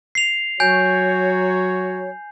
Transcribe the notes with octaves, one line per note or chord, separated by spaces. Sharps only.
C7 F7
F#3 F#4 C#5 G#5 G6